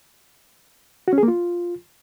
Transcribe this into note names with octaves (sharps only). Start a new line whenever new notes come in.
F#4
C#4
G#4
A#3
F4